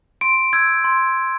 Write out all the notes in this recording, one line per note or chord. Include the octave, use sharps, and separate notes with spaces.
C6 D7
E6 G6 G#6
C6